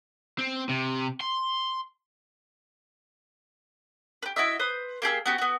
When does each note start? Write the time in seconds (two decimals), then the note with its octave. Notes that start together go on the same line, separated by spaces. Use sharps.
0.39 C4
0.69 C3
1.21 C6
4.23 G4 B4
4.36 E4 F#4 D#5 E5
4.59 B4 C5 D#6
5.02 A#3 G4 G#4 E6
5.26 B3 F#4 G4
5.38 B3 F#4